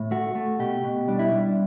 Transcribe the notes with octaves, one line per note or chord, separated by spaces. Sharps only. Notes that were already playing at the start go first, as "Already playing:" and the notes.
Already playing: A2
A3 F#4
A3
B2 G4
B2
G3 D4
E4
G3 D4